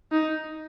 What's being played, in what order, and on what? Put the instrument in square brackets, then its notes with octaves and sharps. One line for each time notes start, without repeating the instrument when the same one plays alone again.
[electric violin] D#4